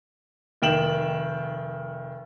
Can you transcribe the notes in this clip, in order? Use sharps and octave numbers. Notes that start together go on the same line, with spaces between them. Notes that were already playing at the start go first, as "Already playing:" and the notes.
F1 D#3 G5 E7 F#7